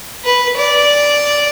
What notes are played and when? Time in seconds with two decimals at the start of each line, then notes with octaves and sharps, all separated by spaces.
0.24 B4
0.57 D5